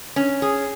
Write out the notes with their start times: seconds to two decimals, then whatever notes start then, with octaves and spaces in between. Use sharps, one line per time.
0.16 C#4
0.42 G#4